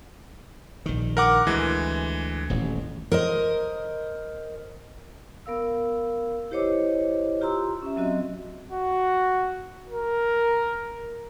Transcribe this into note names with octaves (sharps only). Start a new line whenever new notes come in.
A#1 D#3
A#4 F#5 D6
D2 E3 G#3
D#1 A1
A#4 C5 D#5
B3 A#4 F5 E6
E4 G4 C5 C#5 D#5 D6
F4 G4 A#5 C6 E6
C#4 E5
F#3 C4 F#4 D#5
F#4
A#4